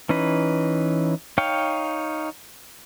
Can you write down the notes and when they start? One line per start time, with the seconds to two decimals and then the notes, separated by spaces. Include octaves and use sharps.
0.09 E3 C#4 D#4 B4
1.38 D#4 C#5 F5 G5